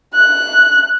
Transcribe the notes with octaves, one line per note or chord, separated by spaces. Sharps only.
F#6